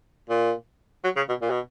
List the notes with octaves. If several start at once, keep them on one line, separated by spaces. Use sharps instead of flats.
A#2
F#3
C#3
B2
A#2
B2